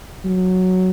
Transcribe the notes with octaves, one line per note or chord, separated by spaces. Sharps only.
F#3